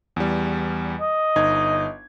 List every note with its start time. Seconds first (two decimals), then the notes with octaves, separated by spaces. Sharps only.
0.16 E2 G3
1.00 D#5
1.36 G1 D#4 G#6